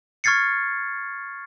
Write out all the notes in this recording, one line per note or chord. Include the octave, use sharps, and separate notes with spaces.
C#6 F6 G#6 A6 C7 C#7